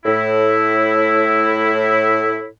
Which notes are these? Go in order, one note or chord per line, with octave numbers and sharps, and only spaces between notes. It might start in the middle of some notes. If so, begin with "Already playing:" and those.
A2 E4